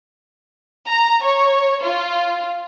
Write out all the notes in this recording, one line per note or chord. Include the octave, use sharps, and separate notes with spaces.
A#5
C#5
F4